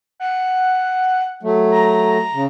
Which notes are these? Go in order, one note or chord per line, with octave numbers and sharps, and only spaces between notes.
F#5
F#3 A3
A#5
C#3